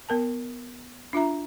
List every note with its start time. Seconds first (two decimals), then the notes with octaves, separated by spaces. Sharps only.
0.09 B3 A#4 A5
1.13 D4 F4 E5 A#5